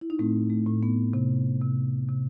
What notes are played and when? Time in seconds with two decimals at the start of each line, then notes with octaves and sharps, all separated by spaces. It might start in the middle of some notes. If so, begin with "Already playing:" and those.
0.01 E4
0.10 D#4
0.19 A2 A3 C4
0.50 A3
0.66 A2
0.83 B3
1.13 C3
1.61 C3
2.09 C3